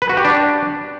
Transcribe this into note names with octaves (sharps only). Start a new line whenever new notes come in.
B4
F#4
G4
D4